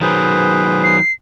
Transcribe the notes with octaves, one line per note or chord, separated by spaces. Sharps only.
D#3 F#3 G#4 B4 C5
C7